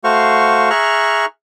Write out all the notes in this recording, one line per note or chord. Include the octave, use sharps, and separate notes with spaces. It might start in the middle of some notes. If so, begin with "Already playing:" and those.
A3 F#4 C5 F5 C#6
G#4 E5 A#5 C#6 F6 F#6